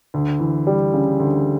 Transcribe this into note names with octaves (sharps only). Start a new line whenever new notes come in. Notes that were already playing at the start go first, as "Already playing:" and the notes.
D2
E3
G3
C#3
D2